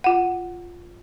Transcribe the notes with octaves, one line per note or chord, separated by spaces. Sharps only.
F4 F#5